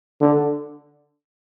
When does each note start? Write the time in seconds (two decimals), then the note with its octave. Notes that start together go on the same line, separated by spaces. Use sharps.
0.21 D3